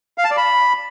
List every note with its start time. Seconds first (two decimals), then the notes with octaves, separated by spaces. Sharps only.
0.18 F5
0.24 A5
0.31 D5
0.37 B5